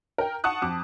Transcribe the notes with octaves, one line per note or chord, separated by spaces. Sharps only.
A#4 G5
F#5 A5 C#6 D#6 F#6
F2 A5 D6